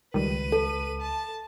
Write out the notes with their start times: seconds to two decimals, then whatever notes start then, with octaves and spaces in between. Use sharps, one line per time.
0.14 C#2 D#3 G3 B4 D#7
0.52 A4
1.01 A5